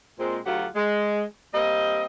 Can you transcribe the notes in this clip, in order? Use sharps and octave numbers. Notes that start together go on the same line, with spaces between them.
A#2 G#3 C4
D2 F#3 F4 G4 A4 F#5
G#3
G3 A#3 C4 D#5